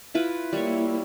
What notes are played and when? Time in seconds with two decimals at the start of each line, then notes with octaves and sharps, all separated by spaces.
0.15 E4 F4 B4
0.53 G3 A#3 E4 C#5